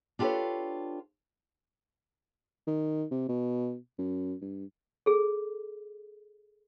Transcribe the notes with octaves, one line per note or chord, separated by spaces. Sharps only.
D4 F4 G4 A4 B4 C#5
D#3
C3
B2
F#2
G2
G#4 A4